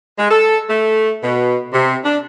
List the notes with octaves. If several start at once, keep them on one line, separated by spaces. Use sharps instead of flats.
G#3
A4
A3
B2
C3
D4